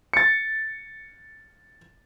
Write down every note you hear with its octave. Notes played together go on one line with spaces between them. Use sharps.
A6 C#7